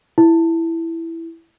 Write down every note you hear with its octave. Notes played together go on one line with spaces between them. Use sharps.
E4